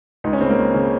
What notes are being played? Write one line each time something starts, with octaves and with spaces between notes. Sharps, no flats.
C#2 D#4
C#4
C#3 C4
A#3
C#2
C#3